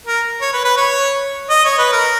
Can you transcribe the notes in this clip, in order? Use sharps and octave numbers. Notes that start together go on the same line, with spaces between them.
A#4
C#5
B4
B4
C#5
D#5
C#5
B4
A#4